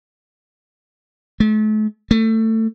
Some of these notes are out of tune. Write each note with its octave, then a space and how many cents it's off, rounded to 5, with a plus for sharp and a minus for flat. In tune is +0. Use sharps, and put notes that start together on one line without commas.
A3 -40
A3 +20